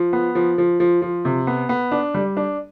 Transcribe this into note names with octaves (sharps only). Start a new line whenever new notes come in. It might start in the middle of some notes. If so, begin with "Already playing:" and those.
Already playing: F3
B3
F3
F3
F3
F3
C3
B3
B3
D4
G3
D4